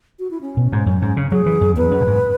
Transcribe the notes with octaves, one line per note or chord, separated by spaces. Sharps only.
F#4
E4
C#4
B2
G#2
F#2
G#2
C#3
F#3 G#4
E3
F#2
E2 B4
F#2
B2
G#2